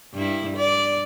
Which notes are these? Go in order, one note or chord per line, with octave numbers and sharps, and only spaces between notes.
G2 E4
D5